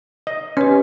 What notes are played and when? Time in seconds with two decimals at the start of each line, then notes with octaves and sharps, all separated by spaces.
0.27 D#5
0.57 C#4 G4 B4